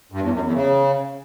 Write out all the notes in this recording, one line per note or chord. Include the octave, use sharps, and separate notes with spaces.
G2
E2
F#2
E2
C#3